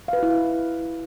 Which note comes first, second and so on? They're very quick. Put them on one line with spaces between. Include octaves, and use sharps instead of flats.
F5 B4 F#4 E4